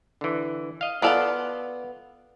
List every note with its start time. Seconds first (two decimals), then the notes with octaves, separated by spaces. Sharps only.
0.21 D3 E3
0.81 D#5 F5
1.02 B3 F4 A4 D5 F5 F#5